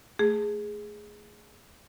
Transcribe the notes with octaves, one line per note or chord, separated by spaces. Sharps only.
A3 G#4